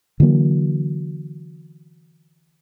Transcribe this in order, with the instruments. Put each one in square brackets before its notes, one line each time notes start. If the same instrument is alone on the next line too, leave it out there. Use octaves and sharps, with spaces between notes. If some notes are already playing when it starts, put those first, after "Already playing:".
[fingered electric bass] D3 E3 F#3 A#3